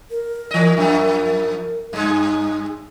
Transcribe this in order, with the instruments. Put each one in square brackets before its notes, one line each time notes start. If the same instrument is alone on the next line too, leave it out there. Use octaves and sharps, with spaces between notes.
[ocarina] A#4
[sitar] E3 D#5
F#2 F3
[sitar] G2 G#3 [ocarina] D#4